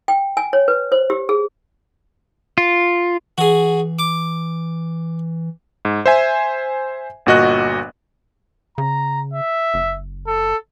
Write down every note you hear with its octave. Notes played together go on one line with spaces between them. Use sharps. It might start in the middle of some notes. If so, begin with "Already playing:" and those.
G5
G#5
C#5
B4
C5
G4
G#4
F4
E3 F#4 G#4
D6
G#2
C5 E5 G#5
G1 A#2 F#4 D#5 F#6
C#3 A#5
E5
F#1
A4